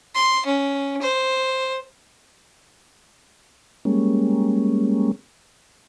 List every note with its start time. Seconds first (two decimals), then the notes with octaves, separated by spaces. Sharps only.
0.15 C6
0.45 C#4
1.01 C5
3.85 G3 G#3 A#3 C#4